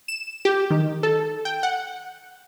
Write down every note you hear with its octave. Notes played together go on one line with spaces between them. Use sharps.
E7
G4
D#3
A4
G5
F#5